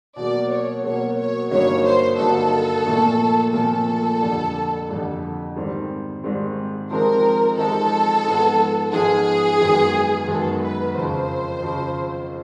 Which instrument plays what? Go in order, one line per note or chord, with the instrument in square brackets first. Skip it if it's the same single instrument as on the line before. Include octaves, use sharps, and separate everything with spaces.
[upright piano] B2 F#3 A#3 [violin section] D5
[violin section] C#5
[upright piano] B2 F#3 A#3 [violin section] C#5
[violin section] C#5
[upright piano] G2 D3 F#3 A#3 D#4 [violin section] C#5
[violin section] C5
[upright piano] G2 D3 F#3 A#3 D#4 [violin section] A4
[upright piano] A#2 F3 A3
[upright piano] A#2 F3 A3 [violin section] A4
[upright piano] F2 D3 G3
F2 D3 G3
G#2 D#3 G3 C4
G#2 D#3 G3 C4
[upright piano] F3 G#3 C4 D#4 G4 [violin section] A#4
[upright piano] F3 G#3 C4 D#4 G4 [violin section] A4
[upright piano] G#2 F3 G#3 B3
[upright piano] G#2 F3 G#3 B3 [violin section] G#4
[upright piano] F#2 D#3 G#3 B3
[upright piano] F#2 D#3 G#3 B3 [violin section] A4
[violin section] B4
[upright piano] F2 C#3 F3 [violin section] C5
[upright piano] F2 C#3 F3